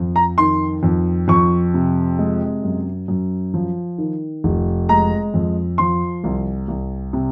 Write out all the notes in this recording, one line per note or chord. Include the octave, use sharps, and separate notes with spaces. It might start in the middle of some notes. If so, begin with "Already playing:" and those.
Already playing: F2 F3
A#5
D#3 C6
F2
F2 C#6
C3
G#3
F#2
F#2
F3
D#3
F1
G#3 A#5
F2
F3 C6
C2
C2
C3